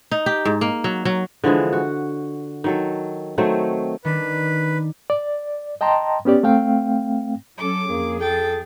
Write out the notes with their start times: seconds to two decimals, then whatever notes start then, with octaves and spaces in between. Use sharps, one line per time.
0.11 D#4
0.26 G4
0.45 G#2
0.61 A#3
0.84 F#3
1.05 F#3
1.44 D3 E3 F3 G#3
1.73 F#4
2.64 D#3 F#3 A4
3.38 D#3 F#3 A3 C4
4.05 D#3 D4 B4
5.10 D5
5.81 D#5 G5 A5 A#5 C6
6.25 B3 C#4 G4 D5
6.43 A3 C4 F5 G5
7.58 F#3 C#4 A4 D6
7.90 F2 A#3 G#4
8.20 A4 G5 A6